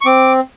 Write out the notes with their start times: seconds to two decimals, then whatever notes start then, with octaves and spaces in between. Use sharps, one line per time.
0.01 C#6
0.06 C4 D6